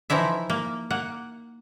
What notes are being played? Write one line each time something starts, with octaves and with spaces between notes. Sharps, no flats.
E3 F3 D#4 E4 E5
A#3
A#3 F#5